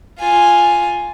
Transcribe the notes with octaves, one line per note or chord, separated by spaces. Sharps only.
F4 G#5